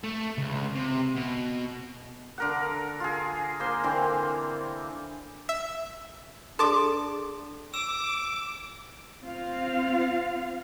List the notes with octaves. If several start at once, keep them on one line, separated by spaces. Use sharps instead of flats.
A3
C#2
C3
B2
D3 A#4 F#5
F4 G#4
A#3 C5 C6
D3 E3 A#3 C4
E5
D4 G#4 A4 A5 C6 D6
D6 E6 E7
C4 F4 F5